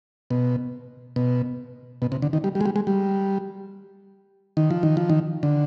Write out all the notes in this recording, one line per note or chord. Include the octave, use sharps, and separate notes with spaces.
B2
B2
B2
C3
D3
D#3
G3
G3
G#3
G3
G#3
G3
D#3
F3
D#3
F3
D#3
D3